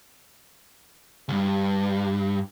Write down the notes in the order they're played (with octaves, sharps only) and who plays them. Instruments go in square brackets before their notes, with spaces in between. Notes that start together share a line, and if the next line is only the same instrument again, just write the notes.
[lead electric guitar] C#2 G2